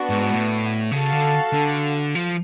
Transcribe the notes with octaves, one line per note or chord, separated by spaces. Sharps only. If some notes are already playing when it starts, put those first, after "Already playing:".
Already playing: B3 D4 F#4
G#2
A2
C#3 F#4 A4 F5 A5
D3
D3
F3